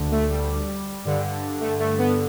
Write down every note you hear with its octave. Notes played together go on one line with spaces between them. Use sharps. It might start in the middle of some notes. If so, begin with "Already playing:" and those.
Already playing: D2 D3
A3
G3
G2 D3
A3
A3
B3